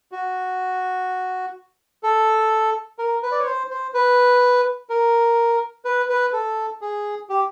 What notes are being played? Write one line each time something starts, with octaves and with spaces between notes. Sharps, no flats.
F#4
A4
A#4
B4
D5
C#5
C5
C5
B4
A#4
B4
B4
A4
G#4
G4